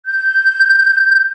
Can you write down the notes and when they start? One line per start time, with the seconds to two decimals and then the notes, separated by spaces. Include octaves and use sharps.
0.06 G6